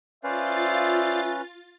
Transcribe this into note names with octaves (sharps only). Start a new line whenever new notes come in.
C#4 F4 B4 C5 D5 E5 F5 A6